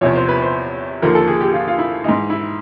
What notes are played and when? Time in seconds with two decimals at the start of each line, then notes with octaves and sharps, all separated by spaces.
0.01 E2 C3 F3 C#5
0.15 C5
0.28 B4
0.42 C5
1.02 D#2 D3 F3 A#4
1.15 A4
1.28 G#4
1.41 G4
1.53 F4
1.68 F4
1.79 E4
2.04 G#2 E3 D#4
2.30 E4